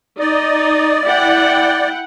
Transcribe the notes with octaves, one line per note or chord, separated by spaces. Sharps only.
D#4 D5 D#5
E4 F#5 G5